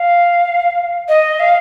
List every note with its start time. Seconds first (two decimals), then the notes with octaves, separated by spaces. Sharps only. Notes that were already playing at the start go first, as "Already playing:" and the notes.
Already playing: F5
1.09 D#5
1.40 F5